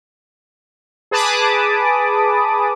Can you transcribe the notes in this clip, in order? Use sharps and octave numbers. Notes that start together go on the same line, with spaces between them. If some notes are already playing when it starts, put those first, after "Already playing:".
G#4 B4 A5 B5 D6 D#6